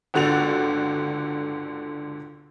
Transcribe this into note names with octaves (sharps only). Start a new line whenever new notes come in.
G1 C#2 D3 F#4 A6 F7